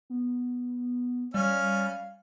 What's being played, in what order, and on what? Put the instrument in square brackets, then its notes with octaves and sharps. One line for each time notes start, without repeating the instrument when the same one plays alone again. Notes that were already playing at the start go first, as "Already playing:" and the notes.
[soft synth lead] B3
[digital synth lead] G3 [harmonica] C#4 F6 [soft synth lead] F5